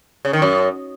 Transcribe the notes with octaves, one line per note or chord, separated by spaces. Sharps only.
C#3
D#3
F#2